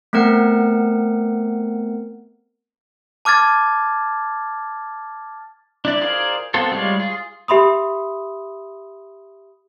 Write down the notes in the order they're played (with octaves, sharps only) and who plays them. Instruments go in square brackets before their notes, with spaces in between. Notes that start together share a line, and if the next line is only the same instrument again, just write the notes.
[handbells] A3 B3 C4 A#4 F#5
[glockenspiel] A5 D6 F6 G#6 A6
[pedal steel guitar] D4 E4 D5
F4 G#4 A#4 C5 D5
B3 C4 F4 A4
G3 G#3 F4 C#5 D5
F4 G#4
[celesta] G4 E5 B5 C6 D#6